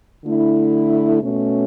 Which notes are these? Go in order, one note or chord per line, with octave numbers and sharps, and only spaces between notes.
D3 A3 E4
B2 A3 C#4